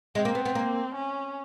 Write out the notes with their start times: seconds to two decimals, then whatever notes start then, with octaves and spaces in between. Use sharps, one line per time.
0.15 G#3 C4
0.25 A#3
0.35 B3
0.45 B3
0.55 A#3
0.95 C#4